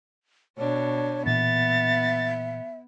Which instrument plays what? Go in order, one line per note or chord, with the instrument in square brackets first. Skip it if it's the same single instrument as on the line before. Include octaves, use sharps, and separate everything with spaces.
[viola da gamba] B2 D4 [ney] C#5
[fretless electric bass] A#2 E3 [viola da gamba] B3 [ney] E5 [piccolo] A6